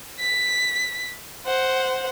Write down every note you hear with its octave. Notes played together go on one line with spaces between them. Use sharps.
B6
C5 F#5